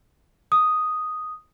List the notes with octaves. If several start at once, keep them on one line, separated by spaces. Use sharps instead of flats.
D#6